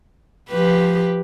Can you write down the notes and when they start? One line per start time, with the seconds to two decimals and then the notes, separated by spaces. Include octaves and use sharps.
0.50 F3 G4 B4